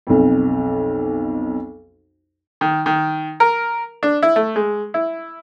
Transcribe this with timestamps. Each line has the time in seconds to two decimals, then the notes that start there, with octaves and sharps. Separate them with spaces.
0.07 B1 F2
2.61 D#3
2.86 D#3
3.40 A#4
4.03 D4
4.22 E4
4.36 A3
4.56 G#3
4.94 E4